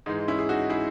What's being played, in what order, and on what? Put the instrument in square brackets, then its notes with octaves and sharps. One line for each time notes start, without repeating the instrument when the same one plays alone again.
[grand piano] G#2 E3 G#3 D#4
C#4 E4
G#4
D#4 F#4
E4 G#4